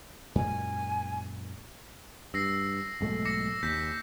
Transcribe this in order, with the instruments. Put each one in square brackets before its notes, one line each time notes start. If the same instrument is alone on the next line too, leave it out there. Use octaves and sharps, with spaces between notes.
[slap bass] F#2 A#2 G#3 [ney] G#5
[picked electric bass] G2 [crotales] E6 A#6 C7
[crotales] A#6
[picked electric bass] B1 G#2 A3
[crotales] D6 A#6 C#7
[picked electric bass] D#2 [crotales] G6 B6